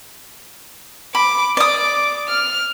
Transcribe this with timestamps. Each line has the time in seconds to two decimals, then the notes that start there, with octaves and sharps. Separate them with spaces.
1.15 B5 D6
1.57 D5 D6 D#6
2.28 F6